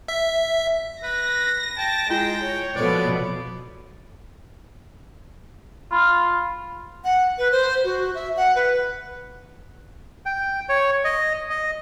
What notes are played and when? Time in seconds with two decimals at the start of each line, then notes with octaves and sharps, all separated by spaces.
0.08 E5
1.03 B4 A#6
1.77 G5 A5
2.10 G#3 E4 F4 G5
2.43 C#5
2.76 B2 F3 B3 A4 C5 D5
5.92 F4 B5 F6
7.04 F#5
7.38 B4
7.52 C5
7.84 F#4
8.15 E5
8.37 F#5
8.56 B4
10.26 G5
10.69 C#5
11.05 D#5
11.50 D#5